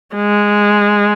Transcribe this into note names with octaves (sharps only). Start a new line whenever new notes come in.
G#3